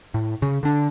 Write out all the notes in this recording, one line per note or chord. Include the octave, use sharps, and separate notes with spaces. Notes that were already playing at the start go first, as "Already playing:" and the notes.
A2
C#3
D3 D4